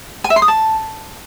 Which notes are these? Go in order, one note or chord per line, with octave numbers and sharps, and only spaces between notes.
G#5
E5
C6
D#6
A5